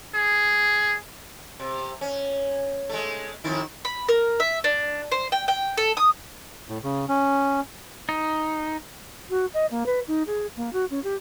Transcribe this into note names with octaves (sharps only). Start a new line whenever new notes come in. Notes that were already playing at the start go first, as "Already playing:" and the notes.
G#4
C3
C#4
G#3 A3
F2 D#3 E4
B5
A#4
E5
D4
C5
G5
G5
A4
D#6
A2
C#3
C#4
D#4
F#4
D#5
A#3
B4
D#4
G#4
A#3
F#4
C#4
G4